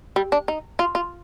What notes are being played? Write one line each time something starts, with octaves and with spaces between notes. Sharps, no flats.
G3
D4
D#4
F4
F4